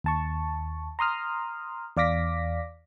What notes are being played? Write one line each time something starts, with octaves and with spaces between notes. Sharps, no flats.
D#2 A5 C#6
A#5 C6 D#6 F6
E2 D5 F5 D6 A#6 B6